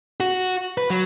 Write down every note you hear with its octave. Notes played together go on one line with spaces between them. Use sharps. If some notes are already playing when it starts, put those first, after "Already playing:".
F#4
B4
F#3